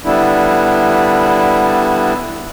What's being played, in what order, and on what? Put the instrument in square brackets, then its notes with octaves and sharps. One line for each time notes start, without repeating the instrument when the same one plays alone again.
[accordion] D3 G3 B3 D4 E4